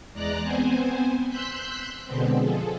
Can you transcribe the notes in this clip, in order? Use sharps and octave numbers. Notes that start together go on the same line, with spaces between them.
E2 G#3 D5 A#5 F#6
B3 C4 C5 G#5
C6 E6 F#6 G6 B6
B2 D3 G#3 B3 C4
F3 G#4 A4